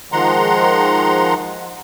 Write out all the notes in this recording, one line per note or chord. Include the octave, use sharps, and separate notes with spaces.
D#3 F3 G#3 F#5 A#5 C6